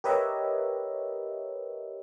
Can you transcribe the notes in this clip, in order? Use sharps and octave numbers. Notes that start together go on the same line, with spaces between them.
G4 A#4 B4 C#5 D#5 E5